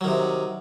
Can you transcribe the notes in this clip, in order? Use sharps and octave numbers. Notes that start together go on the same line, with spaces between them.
C3 D#3 F#3